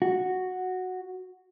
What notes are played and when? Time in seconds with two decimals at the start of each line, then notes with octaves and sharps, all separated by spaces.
0.02 F#4